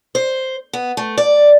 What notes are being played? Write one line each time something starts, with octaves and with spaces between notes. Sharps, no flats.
C5
B3
A3
D5